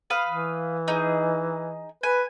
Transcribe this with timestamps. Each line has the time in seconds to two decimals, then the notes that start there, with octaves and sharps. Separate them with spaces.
0.10 B4 F5 D#6
0.27 E3
0.88 D#4 G#4
2.03 B4 G#5